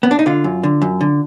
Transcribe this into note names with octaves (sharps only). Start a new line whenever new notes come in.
B3
D4
D#4
D3 F4
F#2
D3
F#2
D3